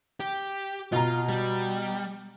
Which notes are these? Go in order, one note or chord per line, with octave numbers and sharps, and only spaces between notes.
G4
B2 F4 A#5
G3